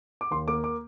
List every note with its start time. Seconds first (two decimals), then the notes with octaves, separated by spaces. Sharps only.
0.21 D6
0.31 D#2 C6
0.48 A#3 D6
0.64 D6